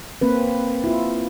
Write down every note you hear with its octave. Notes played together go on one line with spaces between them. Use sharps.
A#3 C4 B4
E4 F4